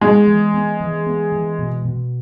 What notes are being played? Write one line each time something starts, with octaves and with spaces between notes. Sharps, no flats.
G#3 B3
E3
B3
E3
B3
E3
B2
B2